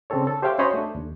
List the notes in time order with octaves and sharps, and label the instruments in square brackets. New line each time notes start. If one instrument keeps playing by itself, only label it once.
[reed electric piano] C#3 C4 D4 A4 C#5
A4
G4 C5 C#5 E5 F5 G5
C#4 F#4 C5 C#5 D#5 B5
A3 D4
D#2